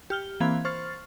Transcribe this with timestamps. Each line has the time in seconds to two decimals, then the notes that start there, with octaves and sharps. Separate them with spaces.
0.10 G4 F6 G7
0.40 E3 A#3 C4 F5 B5 G#6
0.65 C5 C#6 F6 A6